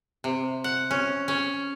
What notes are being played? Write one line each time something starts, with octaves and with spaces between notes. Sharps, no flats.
C3
F#5
C#4
C#4